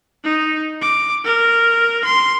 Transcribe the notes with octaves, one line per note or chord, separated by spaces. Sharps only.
D#4
D6
A#4
C6